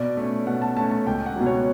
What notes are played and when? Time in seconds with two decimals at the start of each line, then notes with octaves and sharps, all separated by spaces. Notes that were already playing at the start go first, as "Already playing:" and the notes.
Already playing: B2 D5
0.17 A3 C#4
0.47 B2 F#5
0.62 A5
0.77 A3 C#4 A5
0.91 A5
1.07 C#2 G5
1.26 F#5
1.36 B2 F#3
1.46 C#5